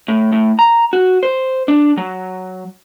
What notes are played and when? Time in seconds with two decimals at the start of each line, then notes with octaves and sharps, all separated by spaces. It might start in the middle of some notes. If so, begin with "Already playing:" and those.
0.08 A2
0.32 A2
0.59 A#5
0.93 F#4
1.23 C5
1.68 D4
1.97 F#3